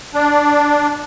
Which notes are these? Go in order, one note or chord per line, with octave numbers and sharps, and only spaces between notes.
D4